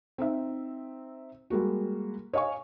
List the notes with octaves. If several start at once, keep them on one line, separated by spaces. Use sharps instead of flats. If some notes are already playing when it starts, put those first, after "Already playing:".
C4 D#4 E5
G3 G#3 A#3 F#4
C#5 D#5 F5 G#5 C#6